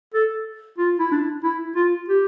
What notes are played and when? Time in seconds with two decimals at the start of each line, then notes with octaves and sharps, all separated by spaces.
0.14 A4
0.78 F4
0.99 E4
1.12 D4
1.44 E4
1.76 F4
2.08 G4